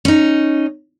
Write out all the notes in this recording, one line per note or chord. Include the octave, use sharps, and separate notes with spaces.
C#4 D#4